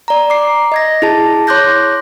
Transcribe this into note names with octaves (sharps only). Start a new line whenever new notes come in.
D5 A#5
D6 C7
D#5 G#6 A#6
E4 G#4 A5
C#5 C6 D6 F#6 G6 A#6